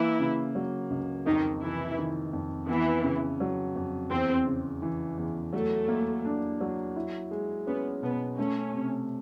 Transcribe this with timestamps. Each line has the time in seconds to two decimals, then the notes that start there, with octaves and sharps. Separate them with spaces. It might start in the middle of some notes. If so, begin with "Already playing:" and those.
Already playing: E3 A#3 E4
0.20 C#3
0.55 F#3
0.91 C#2
1.26 F2 D#3 D#4
1.62 C3 E3 E4
1.98 D#3
2.33 F2
2.68 E3 B3 E4
3.04 C#3
3.40 F#3
3.76 F2
4.11 E2 C4
4.47 C#3
4.82 E3
5.18 E2
5.53 F#3 A3
5.88 A#3
6.25 D4
6.61 F#3
6.96 E4
7.31 G#3
7.67 B3 C#4
8.02 B2 B3
8.38 A3 C#4
8.74 C3